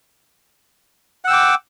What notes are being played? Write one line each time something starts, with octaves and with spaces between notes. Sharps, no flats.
F#5 G5 D6 E6